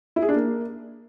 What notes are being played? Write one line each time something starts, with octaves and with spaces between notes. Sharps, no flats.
E4
G#4
D4
A#3